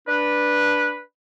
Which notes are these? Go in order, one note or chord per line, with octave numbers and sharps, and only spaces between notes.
D4 B4